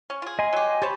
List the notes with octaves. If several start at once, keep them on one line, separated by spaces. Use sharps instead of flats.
C#4
F4 G#4
D#5 G#5 C6
F#3 G4
G4 C5 C#5 A5 B5